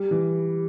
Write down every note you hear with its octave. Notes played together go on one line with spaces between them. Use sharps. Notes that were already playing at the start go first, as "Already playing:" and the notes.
Already playing: G3
E3